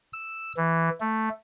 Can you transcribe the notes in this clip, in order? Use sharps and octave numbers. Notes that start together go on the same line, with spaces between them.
E6
E3
A3